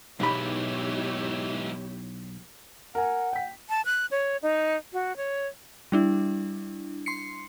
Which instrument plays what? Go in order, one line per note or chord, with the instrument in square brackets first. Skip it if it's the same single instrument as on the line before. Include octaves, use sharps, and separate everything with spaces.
[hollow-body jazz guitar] B1 B5 [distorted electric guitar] G#2 E3 [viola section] E4 G4 C#5
[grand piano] A#4 G#5 [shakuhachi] F#5
[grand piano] G5 B6
[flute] A5
F#6
C#5
D#4
F#4
C#5
[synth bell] G3 D4 E4
C6 C7 C#7